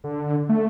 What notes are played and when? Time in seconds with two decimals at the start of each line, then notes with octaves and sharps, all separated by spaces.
0.04 D3
0.49 A3